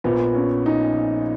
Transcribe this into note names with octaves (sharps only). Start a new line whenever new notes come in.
A#1 A#2 B3
C#4
D#4